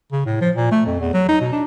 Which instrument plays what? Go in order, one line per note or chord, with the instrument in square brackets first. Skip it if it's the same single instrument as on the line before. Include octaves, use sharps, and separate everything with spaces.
[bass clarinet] C#3
A2
F3
A#2
A3
F2
E2
F#3
D#4
B2
D4